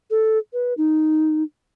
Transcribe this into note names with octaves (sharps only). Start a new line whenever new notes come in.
A4
B4
D#4